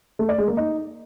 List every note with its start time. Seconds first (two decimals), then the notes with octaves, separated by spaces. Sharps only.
0.19 A3
0.29 D5
0.38 G#3
0.48 A#3
0.57 D#4